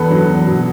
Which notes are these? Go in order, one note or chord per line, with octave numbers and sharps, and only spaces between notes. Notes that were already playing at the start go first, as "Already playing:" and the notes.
Already playing: E2 A4 B4
F#3
E2
B2